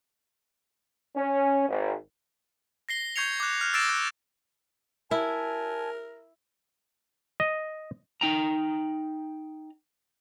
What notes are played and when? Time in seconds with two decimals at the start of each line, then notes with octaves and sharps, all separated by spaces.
1.16 C#4
1.68 G#1
2.89 A#6 C7 G7
3.16 C#6 G6 G#6 C7 C#7 F7
3.40 D6 F#6
3.61 F6 F#6
3.74 E6 A6 A#6 C7 D7 E7
3.89 F#6
5.11 E4 A#4 G#5 A5
7.40 D#5
8.21 D#4 G5 A#5